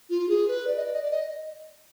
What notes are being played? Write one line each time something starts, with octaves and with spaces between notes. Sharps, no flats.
F4
G#4
B4
D5
D#5
D5
D#5
D5
D#5